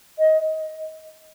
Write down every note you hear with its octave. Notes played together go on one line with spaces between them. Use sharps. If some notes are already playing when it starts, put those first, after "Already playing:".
D#5